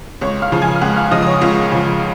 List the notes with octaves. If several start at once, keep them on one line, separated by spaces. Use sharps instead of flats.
C#2 C#5 C#6
F5 F6
C#3 F3
G#5 G#6
F6
C#2 F#5 F#6
F5 F6
C#3 F3 D#5 D#6
D#6
C#5 C#6
C#2 F4 F5
C#3 F3